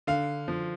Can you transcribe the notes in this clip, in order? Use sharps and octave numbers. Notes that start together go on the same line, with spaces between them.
D3 F5
F3